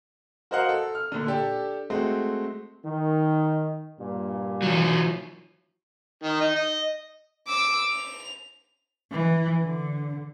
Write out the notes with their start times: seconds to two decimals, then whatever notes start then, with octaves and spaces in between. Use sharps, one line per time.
0.51 F#4 A#4 C5 D#5 F5 F#5
0.69 A4
0.95 F6
1.12 A#2 D3
1.27 D4 G4 A4
1.90 G#3 A3 C4 F#4
2.85 D#3
4.00 G2 A#2
4.62 E3 F#3
6.23 D#3
6.41 D#4
6.55 D#5
7.48 D6 E6
7.90 F7
9.12 E3
9.62 D3